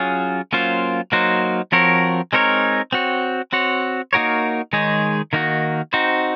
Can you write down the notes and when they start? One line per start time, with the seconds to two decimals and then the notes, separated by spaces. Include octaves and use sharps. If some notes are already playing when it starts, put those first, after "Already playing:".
Already playing: F#3 C#4 F4 G#4
0.53 F#3 A#3 C#4 F4 C5
1.12 F#3 A#3 D#4 F#4 C5
1.72 F3 C4 F#4 A#4 C#5
2.33 G#3 C4 D#4 A#4 C#5
2.92 C4 F#4 C#5
3.53 C4 F#4 C#5
4.13 A#3 D#4 F#4 A#4 C#5
4.73 D#3 G#3 D#4 G#4 C#5
5.33 D#3 A#3 D#4 F#4
5.93 C4 D#4 F#4 C5